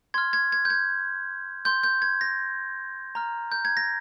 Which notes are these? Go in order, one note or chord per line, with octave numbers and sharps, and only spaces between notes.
C6 F6 G#6
G#6
G#6
G6
G#6
C6 G6
G6
G#6
A#6
A#5 F6
G6
G#6
A#6